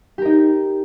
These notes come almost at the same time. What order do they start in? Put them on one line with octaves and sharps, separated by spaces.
G4 A#4 D#4